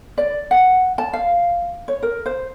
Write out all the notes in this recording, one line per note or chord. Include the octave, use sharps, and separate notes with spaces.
D5
F#5
A5
F5
C#5
A#4
C5